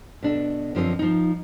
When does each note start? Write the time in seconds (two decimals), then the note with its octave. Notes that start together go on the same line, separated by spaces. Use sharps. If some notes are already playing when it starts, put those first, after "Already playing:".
0.23 B2 D4 A4
0.75 F#2 D3 F3 C4 A4 D#5
0.99 F3 D#4